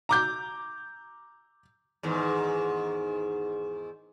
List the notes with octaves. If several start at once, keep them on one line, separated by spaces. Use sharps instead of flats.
A#5 D6 G6
E2 G#2 D#3